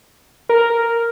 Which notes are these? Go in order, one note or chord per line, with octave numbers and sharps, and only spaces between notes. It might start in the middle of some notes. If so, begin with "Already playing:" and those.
A#4